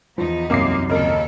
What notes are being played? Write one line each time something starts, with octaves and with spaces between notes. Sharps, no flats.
E2 F3 B3 D#4
C2 F#2 A#3 D6 C7
D#2 A#2 C#3 A4 A#4 D#5